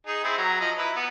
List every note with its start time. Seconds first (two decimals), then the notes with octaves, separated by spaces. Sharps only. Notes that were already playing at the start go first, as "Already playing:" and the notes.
0.07 D#4 G#4
0.24 C4 E4 G#4
0.38 F#3 A#5
0.61 F3 D#5 A#5
0.78 E4 B4
0.96 B3